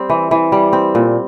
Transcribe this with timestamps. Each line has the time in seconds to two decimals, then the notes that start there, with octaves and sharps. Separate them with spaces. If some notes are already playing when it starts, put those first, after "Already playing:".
Already playing: G3 C4
0.10 E3
0.31 E3
0.52 G3
0.73 C4
0.95 A#2